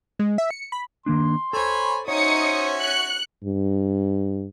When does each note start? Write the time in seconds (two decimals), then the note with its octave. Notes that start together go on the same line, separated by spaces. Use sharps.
0.19 G#3
0.38 E5
0.51 C#7
0.72 B5
1.06 D#3 A#3 D4 C6
1.53 A4 C5 C#5 G#5 B5
2.08 C#4 D#4 F#4 C5 C#5 E5 D#6 C#7
2.78 F#6 C#7
3.44 G2